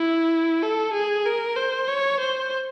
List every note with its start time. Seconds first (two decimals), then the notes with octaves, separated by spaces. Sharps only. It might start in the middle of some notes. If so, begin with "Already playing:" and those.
Already playing: E4
0.62 A4
0.93 G#4
1.26 A#4
1.57 C5
1.88 C#5
2.20 C5